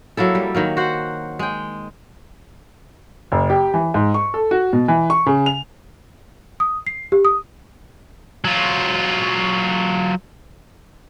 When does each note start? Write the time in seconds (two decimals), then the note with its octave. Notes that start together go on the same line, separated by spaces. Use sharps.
0.17 F#3 A#3 E4 A4
0.35 G3
0.55 D#3 F#3 A#3
0.77 F#4 C5 F#5
1.39 G#3 G5
3.32 F#1
3.50 G4
3.74 E3
3.94 G#2
4.14 C#6
4.34 A4
4.51 F#4
4.73 B2
4.88 E3
5.10 C#6
5.26 C#3
5.46 F7
6.60 D#6
6.87 C7
7.12 G4
7.25 D#6
8.45 F#3 F4